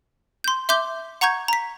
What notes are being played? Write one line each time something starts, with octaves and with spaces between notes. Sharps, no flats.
C6 G6
E5 C6 D6 G6 G7
F#5 A#5 C#6 G6 G#6
A#5 B6